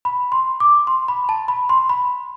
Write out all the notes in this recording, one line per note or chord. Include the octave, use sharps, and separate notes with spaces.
B5
C6
D6
C6
B5
A5
B5
C6
B5